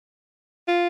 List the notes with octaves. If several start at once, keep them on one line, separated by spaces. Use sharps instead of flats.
F4